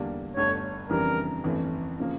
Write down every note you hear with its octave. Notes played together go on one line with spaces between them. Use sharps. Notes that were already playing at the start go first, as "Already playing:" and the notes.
Already playing: E2 D3 G3 A#3 D4
G1 G2 D3 A3 C#5
F2 C#3 E3 G3 D4 A#4
G1 F2 E3 A3 C#4
C#3 F3 A#3